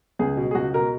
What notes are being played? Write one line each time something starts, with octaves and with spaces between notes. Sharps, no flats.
C#2 G#4
B2
G#4
C#2 F#4
B2 A#4